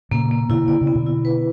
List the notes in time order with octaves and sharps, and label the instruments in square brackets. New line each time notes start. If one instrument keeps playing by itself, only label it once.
[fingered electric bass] A#2 C#3 [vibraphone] A#3
[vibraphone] A#3
[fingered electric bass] B2 D3 [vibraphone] E4
[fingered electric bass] D3 [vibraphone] D5
[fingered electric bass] C#3
[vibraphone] B3
[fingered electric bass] B2 D3
[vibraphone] E4
B4